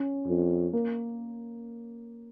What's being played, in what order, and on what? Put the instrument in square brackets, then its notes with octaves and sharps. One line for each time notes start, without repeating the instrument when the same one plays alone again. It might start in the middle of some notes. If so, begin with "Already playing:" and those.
Already playing: [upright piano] C#4
[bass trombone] F2
[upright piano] A#3